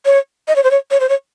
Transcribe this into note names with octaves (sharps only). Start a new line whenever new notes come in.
C#5
D#5
C#5
C5
C#5
C#5
C5
C#5